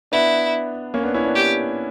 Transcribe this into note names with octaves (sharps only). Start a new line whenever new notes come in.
B3 D4 E4
A#3 C#4
B3 D4
C#4 E4
B3 D4
G4